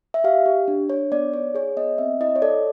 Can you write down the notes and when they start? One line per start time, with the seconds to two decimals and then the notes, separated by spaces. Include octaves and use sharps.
0.14 E5
0.24 G4 F5
0.46 G4
0.68 D4
0.89 D4 C#5
1.12 B3 D5
1.33 D#4 C#5
1.55 G#4 C#5
1.77 B3 D#5
1.98 C4 E5
2.21 E4 D#5
2.36 C#5
2.42 A4 D5